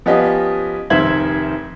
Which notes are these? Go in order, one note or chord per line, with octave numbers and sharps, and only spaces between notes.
F3 B3 C#4 G4 D#5
F1 D#3 C5 E5 G#6 F#7